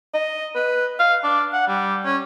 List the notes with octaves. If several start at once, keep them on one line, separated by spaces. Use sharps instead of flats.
D#5
B4
F5
D4
F#5
G3
C#4